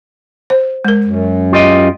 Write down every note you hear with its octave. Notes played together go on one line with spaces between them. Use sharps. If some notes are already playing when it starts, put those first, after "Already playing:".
C5
G#3 A#4
F#2
F4 G4 D#5